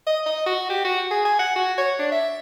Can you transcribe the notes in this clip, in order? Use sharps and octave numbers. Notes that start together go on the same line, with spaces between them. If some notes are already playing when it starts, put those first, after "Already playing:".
D#5
D#5
F#4
G4
F#4
G#4
G#5
F#5
F#4
C#5
D4
E5